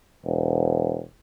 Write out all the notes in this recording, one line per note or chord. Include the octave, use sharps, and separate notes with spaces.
E1